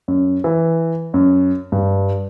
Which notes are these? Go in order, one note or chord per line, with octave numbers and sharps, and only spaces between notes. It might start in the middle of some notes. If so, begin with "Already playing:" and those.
F#2
E3
F#2
G2